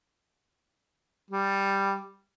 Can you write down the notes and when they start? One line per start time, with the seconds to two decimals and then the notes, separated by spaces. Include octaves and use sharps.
1.30 G3